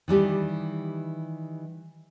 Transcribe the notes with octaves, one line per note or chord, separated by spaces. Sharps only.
D#3 E3 G3 G4